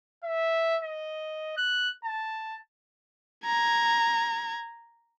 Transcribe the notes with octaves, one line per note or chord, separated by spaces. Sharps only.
E5
D#5
F#6
A5
A#5 G#6